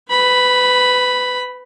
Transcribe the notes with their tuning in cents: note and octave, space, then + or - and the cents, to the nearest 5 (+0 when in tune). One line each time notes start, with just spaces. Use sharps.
B4 +25 B5 +0